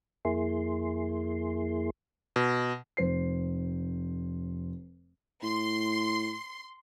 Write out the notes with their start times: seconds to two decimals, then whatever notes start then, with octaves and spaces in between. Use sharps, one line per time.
0.25 F2 A#3 E4 G#4 C6
2.36 B2
2.97 F1 C5 C7
5.43 A2 C6